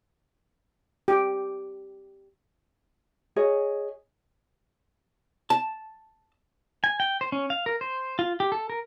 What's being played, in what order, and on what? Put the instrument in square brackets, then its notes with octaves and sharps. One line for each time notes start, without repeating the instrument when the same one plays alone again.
[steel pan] G4
[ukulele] G#4 C#5 D#5
[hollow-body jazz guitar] A5
[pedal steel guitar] G#5
G5
C5
C#4
F5
A#4
C5
F4
G4
A4
A#4